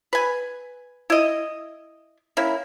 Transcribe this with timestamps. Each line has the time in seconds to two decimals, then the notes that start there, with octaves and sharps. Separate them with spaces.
0.13 B4 G#5
1.10 E4 D#5
2.37 A#3 C#4 E4